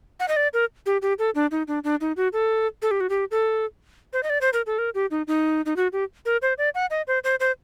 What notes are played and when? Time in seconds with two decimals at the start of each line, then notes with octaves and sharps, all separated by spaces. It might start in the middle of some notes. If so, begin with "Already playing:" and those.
0.20 F#5
0.28 D#5
0.36 D5
0.53 A#4
0.86 G4
1.02 G4
1.19 A4
1.35 D4
1.51 D#4
1.68 D4
1.84 D4
2.01 D#4
2.17 F#4
2.33 A4
2.82 A4
2.91 G4
3.00 F#4
3.09 G4
3.31 A4
4.13 C5
4.23 D#5
4.30 D5
4.41 C5
4.53 A#4
4.66 A4
4.78 A#4
4.95 G4
5.11 D#4
5.28 D#4
5.66 D#4
5.76 F#4
5.93 G4
6.26 A#4
6.42 C5
6.58 D5
6.75 F#5
6.91 D#5
7.08 C5
7.24 C5
7.40 C5